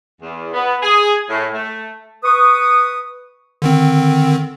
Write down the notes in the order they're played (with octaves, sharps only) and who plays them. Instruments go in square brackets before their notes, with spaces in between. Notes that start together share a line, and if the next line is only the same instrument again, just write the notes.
[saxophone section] E2
B3
G#4
A2
A3
[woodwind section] B4 C#6 D#6
[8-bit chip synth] D3 D#3 C4